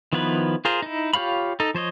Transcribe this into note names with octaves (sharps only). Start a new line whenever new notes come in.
D#3 F3 B3 E4 B4
F4 G#4 A#4 C5
D#4 E4
F4 G4 C#5 F5 B5
D#4 A4
F3 C5 C#5 D#5